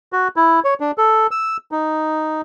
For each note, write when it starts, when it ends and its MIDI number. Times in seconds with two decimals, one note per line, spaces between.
0.13 0.28 66
0.36 0.60 64
0.64 0.74 73
0.80 0.91 62
0.98 1.27 69
1.31 1.57 88
1.72 2.41 63